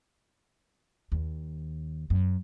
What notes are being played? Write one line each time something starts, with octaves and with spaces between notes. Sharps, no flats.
D#2
F#2